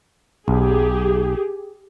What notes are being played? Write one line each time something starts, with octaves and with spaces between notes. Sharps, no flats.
B1 G4 G#4